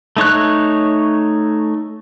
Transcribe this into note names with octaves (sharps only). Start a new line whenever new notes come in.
A3 D#4 C#5 F#6